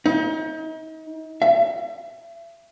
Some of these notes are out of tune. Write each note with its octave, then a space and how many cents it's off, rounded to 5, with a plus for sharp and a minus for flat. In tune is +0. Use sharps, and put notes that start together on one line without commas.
D#4 +40
E5 +35